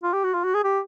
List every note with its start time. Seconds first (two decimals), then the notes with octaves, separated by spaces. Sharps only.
0.03 F4
0.13 G4
0.24 F#4
0.34 F4
0.44 F#4
0.54 G#4
0.64 G4